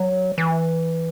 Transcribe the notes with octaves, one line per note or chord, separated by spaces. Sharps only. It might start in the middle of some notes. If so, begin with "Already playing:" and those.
Already playing: F#3
E3